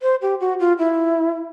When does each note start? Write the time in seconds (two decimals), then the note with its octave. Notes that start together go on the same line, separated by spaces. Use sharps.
0.02 C5
0.22 G4
0.40 F#4
0.60 F4
0.78 E4